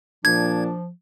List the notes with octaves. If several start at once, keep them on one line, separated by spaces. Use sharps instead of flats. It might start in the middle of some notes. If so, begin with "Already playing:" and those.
A#2 F3 D4 G#6